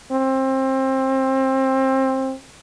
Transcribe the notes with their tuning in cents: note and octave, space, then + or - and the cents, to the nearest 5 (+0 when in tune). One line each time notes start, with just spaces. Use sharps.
C4 +25